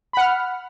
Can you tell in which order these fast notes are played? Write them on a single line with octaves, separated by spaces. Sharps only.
B5 F#5 F6